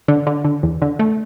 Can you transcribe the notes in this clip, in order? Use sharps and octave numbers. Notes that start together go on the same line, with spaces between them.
D3
D3
D3
E2
D3
A3